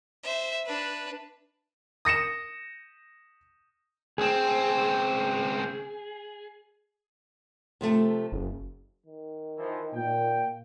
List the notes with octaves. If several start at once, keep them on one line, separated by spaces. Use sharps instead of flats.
C5 E5
D4 B4
D#6 A#6 C#7 E7
C#2 C4 G#4
C3 F3 A3
F#1
D#3
E3 F3
A#2 G5